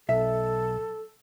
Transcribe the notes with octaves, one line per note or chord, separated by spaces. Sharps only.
B1 A4 E5